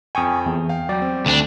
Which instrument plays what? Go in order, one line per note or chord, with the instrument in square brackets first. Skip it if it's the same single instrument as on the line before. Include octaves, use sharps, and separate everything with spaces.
[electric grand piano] F2 G5 [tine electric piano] G#5 C#6 D#6
[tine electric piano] E2
[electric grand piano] F5 G5
[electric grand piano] F#3 [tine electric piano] D5 G5
[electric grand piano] C4
[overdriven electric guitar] D2 D4